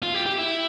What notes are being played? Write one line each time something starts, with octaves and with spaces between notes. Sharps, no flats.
F4
G4
G4
E4